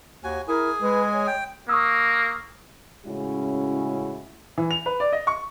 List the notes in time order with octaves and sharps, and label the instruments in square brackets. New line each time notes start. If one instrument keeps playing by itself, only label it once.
[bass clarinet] D#2 [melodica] F#4 G#5
[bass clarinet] E4 [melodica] G#4 G#5 [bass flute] A#4
[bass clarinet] G#3 [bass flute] B4
[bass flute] C#5
[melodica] G5
[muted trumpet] A#3 [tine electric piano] C#6 D#6 E6
[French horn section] A2 C#3 G#3 C#4 E4 F#4
[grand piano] E3
F7
B4
D5
D#5
C#6